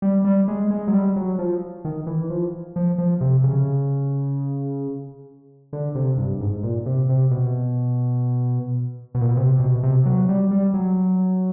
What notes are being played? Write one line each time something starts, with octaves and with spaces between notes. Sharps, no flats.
G3
G3
G#3
G#3
F#3
G3
F#3
F3
D#3
E3
F3
F3
F3
C3
C#3
D3
C3
G2
G#2
A#2
C3
C3
B2
B2
A#2
B2
C3
B2
C3
F#3
G3
G3
F#3